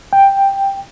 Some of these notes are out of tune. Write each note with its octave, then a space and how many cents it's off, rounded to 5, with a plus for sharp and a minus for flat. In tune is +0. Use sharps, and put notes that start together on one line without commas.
G5 +5